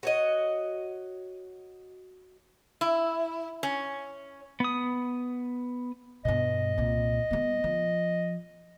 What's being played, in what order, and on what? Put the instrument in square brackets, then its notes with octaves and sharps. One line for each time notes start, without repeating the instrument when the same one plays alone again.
[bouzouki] F#4 C#5 D#5
[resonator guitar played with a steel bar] E4
C#4
[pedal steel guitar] B3 D#6
[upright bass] G2 B2 [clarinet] D#5
[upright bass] C2 A#2
G3 B3
F3